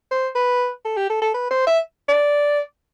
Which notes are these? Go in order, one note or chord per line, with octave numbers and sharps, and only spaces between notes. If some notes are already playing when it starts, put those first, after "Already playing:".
C5
B4
A4
G4
A4
A4
B4
C5
E5
D5